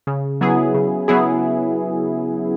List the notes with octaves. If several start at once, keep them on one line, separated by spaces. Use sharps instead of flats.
C#3
F#3 B3 E4 G#4
C#3
F#3 B3 E4 G#4